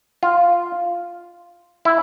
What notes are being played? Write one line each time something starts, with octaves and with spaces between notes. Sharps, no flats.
F4
E4